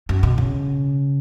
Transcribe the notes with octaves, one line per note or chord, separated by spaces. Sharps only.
F#2
B2
C#3